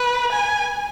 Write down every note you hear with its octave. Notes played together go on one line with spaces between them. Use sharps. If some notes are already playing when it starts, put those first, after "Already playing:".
Already playing: B4
G#5